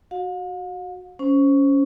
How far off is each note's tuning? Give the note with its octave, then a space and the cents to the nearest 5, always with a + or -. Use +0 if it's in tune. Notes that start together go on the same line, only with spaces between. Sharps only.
F#4 +0 F5 +45
C#4 +10 C5 +0